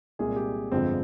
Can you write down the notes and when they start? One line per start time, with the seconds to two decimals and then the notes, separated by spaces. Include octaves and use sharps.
0.19 C2 A#2 G#3 G#4
0.36 G4
0.72 G1 F2 D3 F3 G#3 C4